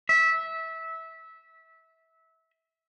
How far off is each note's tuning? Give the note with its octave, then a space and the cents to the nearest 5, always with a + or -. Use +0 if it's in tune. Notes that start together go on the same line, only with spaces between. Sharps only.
E5 -20